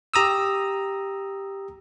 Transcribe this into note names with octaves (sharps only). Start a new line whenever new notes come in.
G4 A#5 D#6 E6